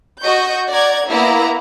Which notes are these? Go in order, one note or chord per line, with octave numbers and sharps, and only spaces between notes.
F#4 D#5 C#6 G6
D5 F#5 A#5 G#6
A#3 B3 E4 A#5